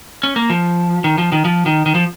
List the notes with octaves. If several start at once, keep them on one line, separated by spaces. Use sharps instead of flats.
C#4
A#3
F3
D#3
F3
D#3
F3
D#3
D#3
F3